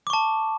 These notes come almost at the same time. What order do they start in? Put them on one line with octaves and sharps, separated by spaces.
D6 C#6 A5